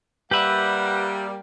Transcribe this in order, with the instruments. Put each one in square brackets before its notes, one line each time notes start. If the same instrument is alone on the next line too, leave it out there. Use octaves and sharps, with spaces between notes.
[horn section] G3 A#3 [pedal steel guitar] G4 E5 [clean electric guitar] B4 B5 [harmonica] F#5